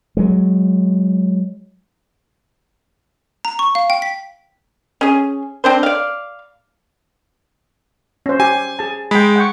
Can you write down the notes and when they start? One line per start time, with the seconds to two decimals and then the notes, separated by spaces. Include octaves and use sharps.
0.17 F#3 G#3
3.45 A#5
3.59 C#6
3.75 F5
3.90 G5
4.02 B6
5.01 C#4 G#4
5.64 C4 D4 C5
5.83 D5 F5
8.26 C#4 C5
8.40 G4 G#5
8.79 G#4 A5
9.11 G#3 G5 B5
9.36 F#5 G5 C#6